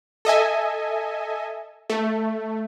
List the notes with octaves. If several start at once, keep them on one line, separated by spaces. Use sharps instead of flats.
A4 D#5 E5 G#5
A3